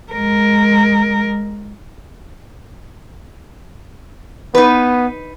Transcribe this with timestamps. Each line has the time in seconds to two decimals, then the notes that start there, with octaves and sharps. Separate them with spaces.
0.13 G#3 A#4
4.55 B3 D#4 B4